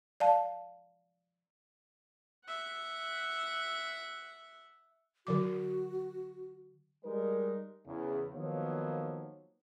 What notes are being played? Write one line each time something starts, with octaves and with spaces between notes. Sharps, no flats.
D5 F5 A5
E5 F#5
D3 F#3 F#4 D6
G3 G#3 D#4 A#4
E2 C#3
D#3 F3 F#3 A#3 B3 C#5